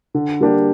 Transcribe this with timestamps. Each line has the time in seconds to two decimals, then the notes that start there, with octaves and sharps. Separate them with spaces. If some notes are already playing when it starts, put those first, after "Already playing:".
0.14 D3
0.41 G3 A#3 D4 G4